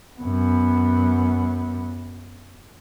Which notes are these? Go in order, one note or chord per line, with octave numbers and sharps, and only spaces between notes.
F#2 B3